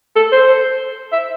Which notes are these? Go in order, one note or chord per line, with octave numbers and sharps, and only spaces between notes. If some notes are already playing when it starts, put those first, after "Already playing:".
A4
C5
E5